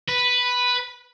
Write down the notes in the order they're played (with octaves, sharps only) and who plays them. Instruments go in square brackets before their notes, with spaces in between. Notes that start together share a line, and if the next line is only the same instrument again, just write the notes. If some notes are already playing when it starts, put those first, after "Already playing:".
[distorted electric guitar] B4